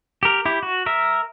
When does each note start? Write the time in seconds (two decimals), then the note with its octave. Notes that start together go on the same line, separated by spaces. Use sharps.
0.23 G4 A#4
0.45 E4 G4
0.63 F#4
0.86 A#4 E5